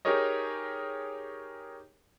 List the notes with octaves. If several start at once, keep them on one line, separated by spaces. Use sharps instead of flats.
D#4 G4 G#4 A#4 C#5 D#5